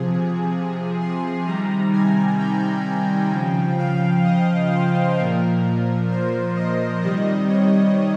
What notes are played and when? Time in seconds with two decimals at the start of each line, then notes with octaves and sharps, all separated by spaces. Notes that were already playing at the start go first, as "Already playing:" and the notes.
Already playing: C3 F3 G#4
1.00 C6
1.46 C3 D#3 G3 A#5
1.93 G#5
2.38 G5
3.32 C#3 F3
3.78 F5
4.24 D#5
4.70 C5
5.17 A#2 F3 A#4
6.10 C5
6.56 D#5
7.02 C3 D#3 G3 D#5
7.49 C#5